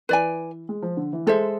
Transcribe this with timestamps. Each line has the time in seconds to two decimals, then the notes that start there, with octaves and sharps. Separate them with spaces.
0.09 E3 B4 D5 G#5
0.69 G#3
0.82 F3
0.97 D3
1.13 E3
1.27 G#3 A4 C5 E5